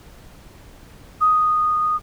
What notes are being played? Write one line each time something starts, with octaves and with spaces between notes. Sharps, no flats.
D#6